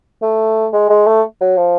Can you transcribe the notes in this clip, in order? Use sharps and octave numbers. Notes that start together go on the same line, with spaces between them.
A3
G#3
G#3
A3
F#3
F3